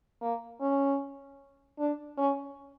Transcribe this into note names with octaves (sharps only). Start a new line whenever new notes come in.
A#3
C#4
D4
C#4